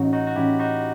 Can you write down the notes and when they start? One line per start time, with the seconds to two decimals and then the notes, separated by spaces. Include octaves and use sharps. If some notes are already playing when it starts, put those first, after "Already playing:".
Already playing: A1 D#4 F#4
0.13 D#4 F#4
0.27 F#4
0.36 A1 E4 G4
0.59 D#4 F#4